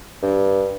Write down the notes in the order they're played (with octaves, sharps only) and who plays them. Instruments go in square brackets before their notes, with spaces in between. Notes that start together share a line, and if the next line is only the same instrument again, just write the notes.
[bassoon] G2